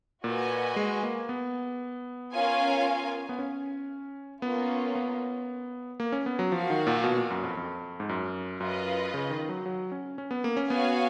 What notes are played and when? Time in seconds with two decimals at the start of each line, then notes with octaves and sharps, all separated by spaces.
0.24 A#2 F#4 B4 D#5 G#5
0.76 G#3
1.03 A#3
1.29 B3
2.33 C#4 F4 A#4 F5 G#5
3.29 B3
3.39 C#4
4.42 A#3 B3 C#4 F4
4.95 B3
6.00 A#3
6.12 C#4
6.26 B3
6.39 F#3
6.52 F3 F#4 A#4 F5
6.70 D#3
6.87 A#2
7.04 B2
7.17 A#2
7.30 F#2
7.44 F2
7.57 F2
8.00 G#2
8.09 F#2
8.60 F#2 F4 B4 D#5
9.14 C#3
9.30 D#3
9.49 F#3
9.66 F#3
9.92 C#4
10.18 C#4
10.31 B3
10.44 A#3
10.57 C#4
10.70 B3 F#4 C#5 F5 G#5